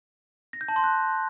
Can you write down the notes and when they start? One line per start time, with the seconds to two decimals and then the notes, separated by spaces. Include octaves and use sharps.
0.53 A#6
0.61 G6
0.68 A5
0.76 C6
0.84 F#6